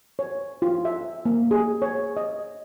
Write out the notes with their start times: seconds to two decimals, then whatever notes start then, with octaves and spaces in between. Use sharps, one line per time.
0.19 C#5
0.62 F4
0.85 E5
1.25 A#3
1.51 G#4
1.82 C#5
2.17 D#5